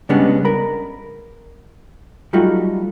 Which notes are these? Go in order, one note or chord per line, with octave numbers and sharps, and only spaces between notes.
C#3 G3 G#3 B3 C#4 D4
A#4 B5
F#3 G3 A3 D#4 F4 F#4